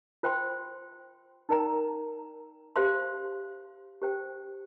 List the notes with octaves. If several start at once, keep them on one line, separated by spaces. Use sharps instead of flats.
F4 C5 G5 C6
D#4 A#4 D5 G5 A#5
G4 C5 F5 C6
G4 C5 G5